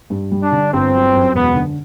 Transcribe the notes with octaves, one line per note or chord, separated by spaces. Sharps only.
G2
G3
D4
D3
G1 C4
F#3
F#2
E1 B3
D3